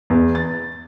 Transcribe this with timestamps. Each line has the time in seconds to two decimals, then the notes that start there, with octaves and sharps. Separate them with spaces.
0.10 E2
0.35 A6